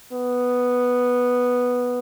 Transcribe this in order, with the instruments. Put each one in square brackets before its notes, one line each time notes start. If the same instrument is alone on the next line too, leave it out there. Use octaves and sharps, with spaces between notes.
[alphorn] B3